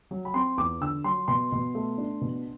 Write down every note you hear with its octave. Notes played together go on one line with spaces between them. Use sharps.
F#3
B5
C4 C6
E2 D6
D3 E6
F#3 C6
B2 C6
B2
A3
D4
B2